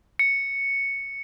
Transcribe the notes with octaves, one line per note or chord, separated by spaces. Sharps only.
C#7